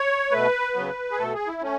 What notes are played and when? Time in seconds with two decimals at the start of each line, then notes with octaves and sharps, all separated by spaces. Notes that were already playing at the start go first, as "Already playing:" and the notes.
Already playing: C#5
0.31 B2 A3 B4
0.74 C#3 F#3 B3
1.11 G#4
1.18 B2 A3 A4
1.34 G#4
1.47 E4
1.62 A3 C#4